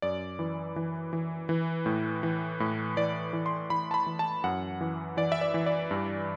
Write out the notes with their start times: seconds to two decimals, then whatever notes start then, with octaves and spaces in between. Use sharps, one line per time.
0.02 F#2 D5
0.39 E3
0.76 E3
1.13 E3
1.49 E3
1.86 A2
2.23 E3
2.60 A2
2.97 E3 D5
3.33 E3
3.46 C6
3.70 E3 B5
3.91 A5
3.94 B5
4.07 E3
4.19 A5
4.44 F#2 F#5
4.81 E3
5.17 E3 D5
5.32 E5
5.41 D5
5.54 E3
5.66 D5
5.91 G2